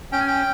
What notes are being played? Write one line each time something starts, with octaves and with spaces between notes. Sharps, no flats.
C#4 G5
G#5
G5